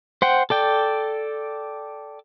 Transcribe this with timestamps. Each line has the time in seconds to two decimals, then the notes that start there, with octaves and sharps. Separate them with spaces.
0.22 C5 F#5 G5
0.50 A4 D5 G5